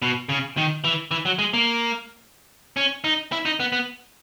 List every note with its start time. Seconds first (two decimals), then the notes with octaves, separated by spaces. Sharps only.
0.02 B2
0.29 C#3
0.57 D#3
0.84 E3
1.11 E3
1.25 F#3
1.39 G#3
1.53 A#3
2.77 C#4
3.04 D#4
3.32 E4
3.45 D#4
3.60 B3
3.72 B3